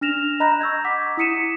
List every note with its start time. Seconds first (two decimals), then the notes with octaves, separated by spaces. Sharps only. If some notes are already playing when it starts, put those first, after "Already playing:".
0.01 D4 F6 A#6 E7 F7
0.40 D#5 A#5 B5 F#6 G6 A#6
0.60 C#6 E6 G6 G#6
0.84 F#5 D6 B6
1.17 E4 D#6 B6 C#7 D#7 E7